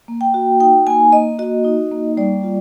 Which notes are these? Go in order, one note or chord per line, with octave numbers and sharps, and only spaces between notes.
A#3
G5
F#4
D#4 G5
A#3 G#5
A#3 D#5
F#4 D#5
D#4
A#3
G3 D5
F4